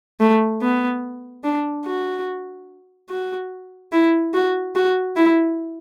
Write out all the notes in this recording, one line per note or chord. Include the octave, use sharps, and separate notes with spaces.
A3
B3
D4
F#4
F#4
E4
F#4
F#4
E4